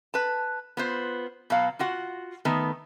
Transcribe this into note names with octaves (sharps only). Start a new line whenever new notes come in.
B4 A5
B3 F4 C5
B2 F#3 F5
F4 F#4 F#5
D#3 A3 B3